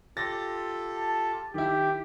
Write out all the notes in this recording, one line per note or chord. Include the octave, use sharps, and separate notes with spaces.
F4 G4 A4 A6 A#6
A5
D#3 E4 G4